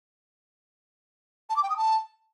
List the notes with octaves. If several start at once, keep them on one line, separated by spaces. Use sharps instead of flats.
A5
D6
G5
D#6
A5